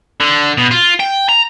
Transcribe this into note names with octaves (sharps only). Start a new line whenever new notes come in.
D3
B2
F4
G5
A#5